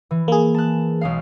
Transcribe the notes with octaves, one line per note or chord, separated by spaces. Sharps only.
E3
A#3 G#4
A5 F#6
B1 G#3 F5